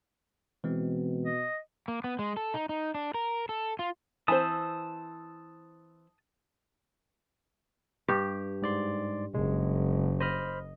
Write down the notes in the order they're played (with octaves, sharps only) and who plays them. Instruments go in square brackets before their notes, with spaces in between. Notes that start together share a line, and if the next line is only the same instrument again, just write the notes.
[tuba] B2 [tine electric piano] E3 G#3 C4
[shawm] D#5
[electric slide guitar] A#3
B3
G#3
A4
D#4
D#4
D4
A#4
A4
F4
[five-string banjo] E3 C4 C5 [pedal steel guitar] A5 D#6
[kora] G2 G4
[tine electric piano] G#2 D5 C6
[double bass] F#1 [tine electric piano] G#3
[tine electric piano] C5 B5 F6 [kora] D#5